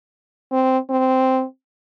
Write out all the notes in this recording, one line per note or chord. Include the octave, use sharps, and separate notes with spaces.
C4
C4